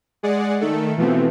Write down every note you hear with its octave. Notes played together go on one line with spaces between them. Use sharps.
G#3 G#4 D5 F#5
D#3 A3 A4
B2 E3 F3 A3 B3 C4